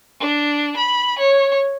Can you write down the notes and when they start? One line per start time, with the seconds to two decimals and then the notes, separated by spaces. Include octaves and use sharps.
0.20 D4
0.77 B5
1.19 C#5